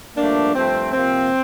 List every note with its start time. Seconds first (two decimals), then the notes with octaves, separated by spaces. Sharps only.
0.16 G2 F3 A3 A#3 D4
0.55 G2 F3 A3 C4
0.92 C3 F3 A#3 C4